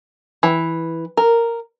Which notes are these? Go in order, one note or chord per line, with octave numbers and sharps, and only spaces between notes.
E3
A#4